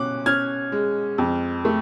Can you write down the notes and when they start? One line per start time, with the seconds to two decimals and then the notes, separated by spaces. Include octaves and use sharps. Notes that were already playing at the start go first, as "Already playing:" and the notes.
Already playing: B2 C#4 D6 F#6
0.26 C#4 F6 G#6
0.72 G#3
1.18 F2
1.65 A3